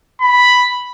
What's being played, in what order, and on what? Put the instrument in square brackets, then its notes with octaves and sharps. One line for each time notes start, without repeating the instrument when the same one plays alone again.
[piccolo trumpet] B5